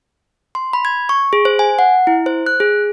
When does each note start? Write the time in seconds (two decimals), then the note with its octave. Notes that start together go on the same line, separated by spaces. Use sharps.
0.55 C6
0.73 B5
0.85 G#6
1.09 C#6
1.33 G#4
1.45 C5
1.59 G#5
1.79 F#5
2.07 E4
2.26 C5
2.46 F#6
2.60 G#4